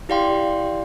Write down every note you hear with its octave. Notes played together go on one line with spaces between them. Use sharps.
E4 G4 D5 F5 G5 C6